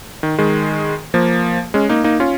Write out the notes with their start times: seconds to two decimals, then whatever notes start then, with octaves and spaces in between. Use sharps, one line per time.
0.23 D#3
0.38 D#3 G#3
1.14 F3 A#3
1.74 G#3 C#4
1.89 A#3 D#4
2.04 A#3 D#4
2.20 C#4 F4